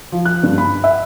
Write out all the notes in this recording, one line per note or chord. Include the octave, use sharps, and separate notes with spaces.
F3
F#6
G2
B5
E5